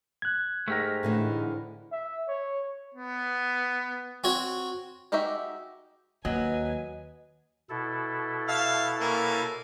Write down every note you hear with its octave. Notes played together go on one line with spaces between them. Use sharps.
F#6 G#6
G#2 A3 G4 A#4
A2 D3 E3
E5
C#5
B3
C4 F#4 C#5
G#3 D#4 F#4 G4 E5
D#2 F#3 B4 D#5 G#5
B2 E4 A4
E5 F5 A5
A#3 C#4